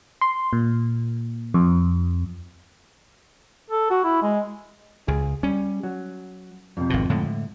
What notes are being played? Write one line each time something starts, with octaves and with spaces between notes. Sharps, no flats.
C6
A#2
F2
A4
F#4
E4
G#3
C#2 G#4
G3 C#4
F#3
F2 C3
G#1 B2
A2 D3 G#3